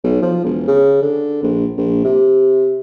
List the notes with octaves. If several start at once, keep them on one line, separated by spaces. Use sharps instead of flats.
B1
F3
E1
C#3
D3
A#1
A#1
C3